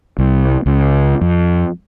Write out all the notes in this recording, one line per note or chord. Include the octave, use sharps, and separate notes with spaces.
C2
C#2
F2